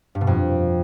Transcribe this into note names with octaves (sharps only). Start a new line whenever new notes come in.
G2
B2
F2